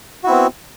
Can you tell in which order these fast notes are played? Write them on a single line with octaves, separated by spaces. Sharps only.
F#4 E4 C4 B3